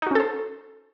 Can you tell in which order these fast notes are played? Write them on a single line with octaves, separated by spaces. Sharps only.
D#4 F#4 C#4 A4 C5